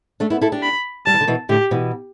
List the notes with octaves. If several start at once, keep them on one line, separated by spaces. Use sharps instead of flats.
A3 D4
B3 E4
E4 A4
D4 G4
B5
G3 A5
E3
D3
B2 E3
A2 D3 G4
B2 E3